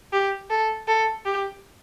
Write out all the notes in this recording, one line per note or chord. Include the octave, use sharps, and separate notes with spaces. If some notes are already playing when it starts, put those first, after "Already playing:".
G4
A4
A4
G4